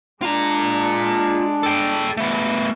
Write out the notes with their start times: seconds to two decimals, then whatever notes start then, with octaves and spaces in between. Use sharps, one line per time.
0.22 G#3 D4 F4 A#5
1.63 A4 G5
2.17 A3 B3